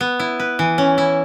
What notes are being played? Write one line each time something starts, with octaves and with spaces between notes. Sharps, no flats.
B3
E4
B4
E3
C#4
E4